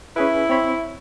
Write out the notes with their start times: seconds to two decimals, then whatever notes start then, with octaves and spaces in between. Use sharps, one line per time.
0.16 C#4 E4 G#4 B4
0.50 C4 C#5 B5